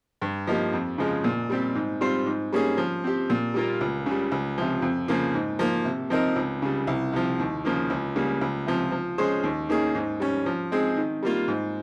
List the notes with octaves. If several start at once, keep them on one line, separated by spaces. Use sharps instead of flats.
G2
F3 A#3 D#4 G4
F2
C#3 F3 G#3
A#2
G3 C4 G4
G#2
G3 C4 F4 C5
G#2
G3 A#3 C#4 G#4
F3
C4 G4
A#2
G3 A#3 F4 A#4
C#2
C#3 G3
C#2
C3 F3
F2
C#3 F3 A#3
G#2
F3 A#3
C3
F3 C4 D#4 A#4
C#2
C#3 G3
C2
C3 F3
D#2
C#3 F3 A#3
C#2
C#3 G3 A#3
C#2
C3 F3
F3
G#3 C#4 G#4 C5
D#2
D#3 A#3 C#4 G#4
G#2
G3 C#4
F3
G#3 C4 D#4 G#4
D#3
G3 A#3 F4
G#2